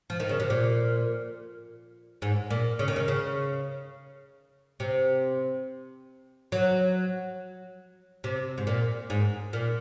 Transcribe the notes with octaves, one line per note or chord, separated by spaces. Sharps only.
F3
D#3
C#3
C3
A#2
G#2
A#2
C#3
D#3
C#3
C#3
C3
F#3
C3
G#2
A#2
G#2
A#2